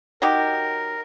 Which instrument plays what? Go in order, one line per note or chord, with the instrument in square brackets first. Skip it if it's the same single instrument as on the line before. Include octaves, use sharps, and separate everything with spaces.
[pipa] F#3 D#4 G4 [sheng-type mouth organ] A#4